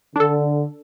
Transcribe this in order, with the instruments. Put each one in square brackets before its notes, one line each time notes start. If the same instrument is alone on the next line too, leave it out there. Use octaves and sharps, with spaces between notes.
[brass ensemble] D3 [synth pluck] D4 A4